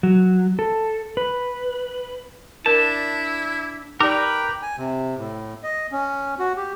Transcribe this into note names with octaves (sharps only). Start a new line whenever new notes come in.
F#3
A4
B4
D4 E4 A#4 A5
D#4 G4 A#4 B4 D5 G5 D6
G#5
C3
A2
D#5
C#4
F#4
G4